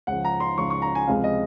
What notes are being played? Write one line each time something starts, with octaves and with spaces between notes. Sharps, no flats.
C#2 C#3 F3 F#5
A#5
C6
C#2 C#3 F3 C#6
C#6
A#5
G#5
C#2 C3 F3 G#3 F5
D#5